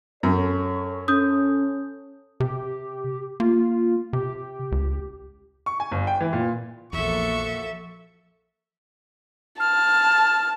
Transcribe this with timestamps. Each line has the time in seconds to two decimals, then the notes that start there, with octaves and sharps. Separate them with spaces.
0.23 F#2 A4 C#5 C#6
1.08 C#4 D#6 G6
2.40 C3 G4
3.40 A#3 F4
4.13 C3 G4
4.72 C#2
5.66 C#6
5.80 G#5
5.91 G1
6.07 G5
6.20 E3
6.33 A#2
6.93 A#1 E2 F3 A#3 F#4 A4 E5 C#6
9.60 A5 F6